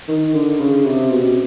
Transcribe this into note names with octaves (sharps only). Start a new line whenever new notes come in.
D#3
D3
C#3
C3
B2